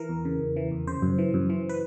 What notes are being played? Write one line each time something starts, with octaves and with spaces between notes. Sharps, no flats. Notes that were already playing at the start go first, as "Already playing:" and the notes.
Already playing: E3 A#4
E2
C#3
E2
E3
E2
C#3 C5
F#2
E3
F#2
E3
B4